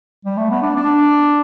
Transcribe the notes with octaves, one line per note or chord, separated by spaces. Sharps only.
G3
A3
B3
D4
D4